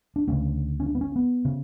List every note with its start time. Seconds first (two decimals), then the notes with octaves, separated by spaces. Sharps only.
0.16 D4
0.28 D2 C#3 C#4
0.80 C#4
0.86 D4
0.95 B3
1.01 C#4
1.16 B3
1.45 C#3